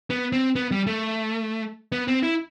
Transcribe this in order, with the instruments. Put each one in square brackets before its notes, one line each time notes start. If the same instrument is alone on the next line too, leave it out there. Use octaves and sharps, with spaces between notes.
[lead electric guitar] B3
C4
B3
G3
A3
B3
C4
E4